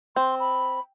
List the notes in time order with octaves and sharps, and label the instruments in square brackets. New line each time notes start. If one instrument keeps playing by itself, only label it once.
[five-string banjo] C4 [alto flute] C6
[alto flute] B5